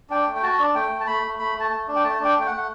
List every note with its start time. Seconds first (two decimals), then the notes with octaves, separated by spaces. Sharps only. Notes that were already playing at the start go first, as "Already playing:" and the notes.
0.10 D4 G5
0.26 A3
0.35 G5
0.42 F#4 A5
0.59 D4
0.75 A3 G5
0.91 A3
1.00 A5
1.07 A3 B5
1.23 A3
1.39 A3 B5
1.56 A3 A5
1.71 A3
1.88 D4
1.96 G5
2.03 A3 A5
2.20 D4 G5
2.36 A3 G5
2.47 F#5
2.52 A3
2.57 F#5